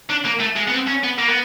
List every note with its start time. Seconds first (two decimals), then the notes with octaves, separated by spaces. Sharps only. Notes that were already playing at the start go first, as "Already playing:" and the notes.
0.10 D4
0.25 A#3
0.40 A3
0.56 G#3
0.68 B3
0.72 C4
0.88 C#4
1.04 B3
1.19 A#3
1.29 B3